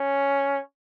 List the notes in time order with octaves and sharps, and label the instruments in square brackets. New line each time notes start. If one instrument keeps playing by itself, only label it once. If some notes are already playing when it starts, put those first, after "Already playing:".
Already playing: [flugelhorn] C#4